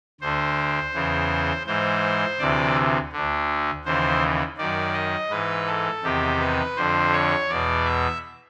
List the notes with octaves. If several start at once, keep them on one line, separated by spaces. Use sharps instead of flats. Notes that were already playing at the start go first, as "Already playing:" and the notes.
D2 D3 C5
E2 C#3 E3
G#2 E3 C5
D2 C3 E3 D5
D2 D3
D#2 C#3 E3 C5
F#2 D#3 D5
D#5
G#2 E3 B4
A4
E2 C3 D#3 G4
B4
F2 D3 C5
C#5
E2 B2 D5
E5